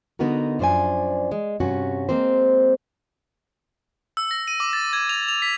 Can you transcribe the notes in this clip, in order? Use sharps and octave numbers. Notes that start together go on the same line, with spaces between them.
D3 B3 D#4 F#4 A#4
F#2 F3 D4 C5 D5 G#5
G#3
G2 C3 C#4 F#4
G#3 A#3 C4 C5
E6
A#6
D#7
D6
A6
G#6
F7
F7
B6